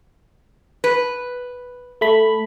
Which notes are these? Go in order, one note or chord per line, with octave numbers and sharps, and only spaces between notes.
B4
A3 B5